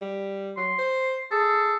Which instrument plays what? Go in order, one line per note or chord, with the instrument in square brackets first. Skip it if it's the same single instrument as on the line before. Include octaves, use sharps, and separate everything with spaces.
[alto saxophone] G3
[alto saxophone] F#3 [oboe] C6
[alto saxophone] C5
[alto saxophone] G#4 [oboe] A4